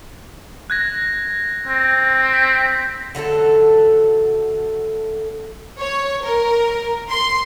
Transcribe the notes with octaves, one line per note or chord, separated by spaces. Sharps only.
F#6 G#6 A#6
C4
B6
D3 F#3 A3 A4
C#5
A#4
C6